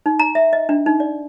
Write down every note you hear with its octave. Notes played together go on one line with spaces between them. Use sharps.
D#4
A#5
E5
D#5
D4
D#4
D5